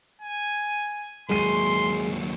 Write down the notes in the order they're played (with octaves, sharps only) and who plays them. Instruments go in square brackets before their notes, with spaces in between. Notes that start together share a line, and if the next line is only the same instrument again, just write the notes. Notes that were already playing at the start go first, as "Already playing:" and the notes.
[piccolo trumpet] G#5
[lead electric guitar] D#2 F#3 [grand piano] G#3 D#7 [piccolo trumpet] C6